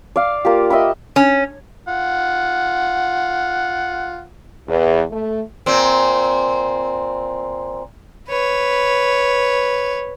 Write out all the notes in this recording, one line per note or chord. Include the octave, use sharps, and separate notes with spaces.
D5 F5
A#3 F4 G4
D#5 E5 G5 B5
C#4
F4 F#5
E2
A3
A#2 C4
B4 C#5